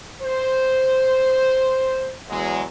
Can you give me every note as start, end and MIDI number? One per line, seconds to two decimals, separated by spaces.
0.22 2.13 72
2.30 2.63 40
2.30 2.63 54
2.30 2.63 56